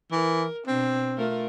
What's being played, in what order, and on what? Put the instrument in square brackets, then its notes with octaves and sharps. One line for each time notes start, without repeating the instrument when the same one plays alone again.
[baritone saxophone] E3 [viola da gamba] A#4
[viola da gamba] B2 D4 [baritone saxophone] C4
[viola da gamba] A3 F4 A#4